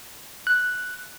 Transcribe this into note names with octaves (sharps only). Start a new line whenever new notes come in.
F#6